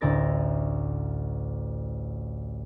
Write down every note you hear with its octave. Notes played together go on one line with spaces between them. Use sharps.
A1 D2 E4 A#4 A6 A#6